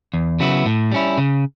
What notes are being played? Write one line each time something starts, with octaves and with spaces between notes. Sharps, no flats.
E2
C#3 F#3 B3 E4
A2
G3 C#4 E4
C#3